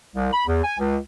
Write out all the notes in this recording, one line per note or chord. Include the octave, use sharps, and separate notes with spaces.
C2
B5
E2
G#5
C#2